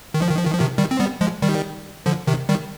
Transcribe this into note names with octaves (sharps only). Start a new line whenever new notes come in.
D#3
F3
D#3
F3
D#3
F3
C3 D#3
D#3 G3
C4
G3 B3
F3 G#3
D#3 G3
D3 F3
C3 D#3
D#3 G3